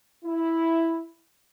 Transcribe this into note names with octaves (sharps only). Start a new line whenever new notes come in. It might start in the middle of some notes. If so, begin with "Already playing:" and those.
E4